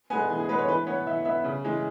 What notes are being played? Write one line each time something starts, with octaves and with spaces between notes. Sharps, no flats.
G#3 B3 G#5
E3 G#5
G#4
G#3 B3 B4
C#5
E3 B4
B3 C#5
E3 E5
B3 E5
C#3
E3 G#3